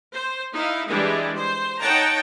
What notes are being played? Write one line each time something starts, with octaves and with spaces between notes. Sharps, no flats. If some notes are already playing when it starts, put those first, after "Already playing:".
C5
D#4 E4 F5
E3 G3 G#3 D4 E4
C5
D#4 C#5 F#5 G5 A5 A#5